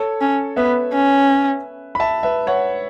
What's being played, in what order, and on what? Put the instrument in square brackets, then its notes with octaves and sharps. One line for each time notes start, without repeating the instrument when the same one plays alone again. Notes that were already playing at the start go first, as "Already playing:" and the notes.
Already playing: [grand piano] A4 C#5
[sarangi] C#4
[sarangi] B3 [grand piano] B4 E5
[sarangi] C#4
[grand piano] B5
E5 A5
B4 E5
C#5 F#5